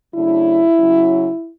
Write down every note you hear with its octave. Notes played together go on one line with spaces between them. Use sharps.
C#3 F#3 A3 D4 E4
C#3 F#3 C#4